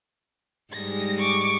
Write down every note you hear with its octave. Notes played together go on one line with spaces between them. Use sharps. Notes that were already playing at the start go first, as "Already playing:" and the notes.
G#2 G3 G#3 A#6
C#6 D6